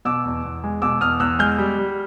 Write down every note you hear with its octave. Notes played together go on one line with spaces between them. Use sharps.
B2 D6 E6
E2
E2
G#3
B2 D6 E6
E2 D#6 F6
E2 E6 F#6
G#3 F6 G6
G3
G3